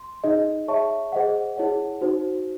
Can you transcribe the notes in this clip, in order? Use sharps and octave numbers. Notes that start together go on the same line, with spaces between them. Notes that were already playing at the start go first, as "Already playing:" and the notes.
Already playing: C6
D#4 G#4 D#5
G#4 C#5 E5 A5 C#6
G#4 C5 D#5 F#5
E4 G#4 C#5 F#5
D#4 F#4 C5